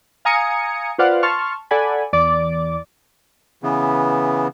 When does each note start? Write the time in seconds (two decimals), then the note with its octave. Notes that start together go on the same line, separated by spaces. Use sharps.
0.25 F5 G#5 A#5 D#6 G#6 C#7
0.98 F4 B4 C5 D5 F5 F#5
1.23 A5 C6 C#6 F6
1.71 A4 D5 F#5 G#5 B5
2.13 E2 D5 D6
3.63 C#3 E3 B3